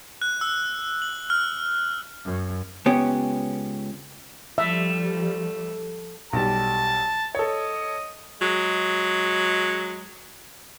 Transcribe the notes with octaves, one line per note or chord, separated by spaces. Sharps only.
F#6
E6
F#7
F6
F#2
C#2 B3 C#4 G4
F3 G3 A3 E5
B1 G3 A5
A4 C#5 D#5
F#3 G#3